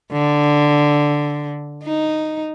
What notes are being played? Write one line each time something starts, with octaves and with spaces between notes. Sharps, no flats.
D3
D#4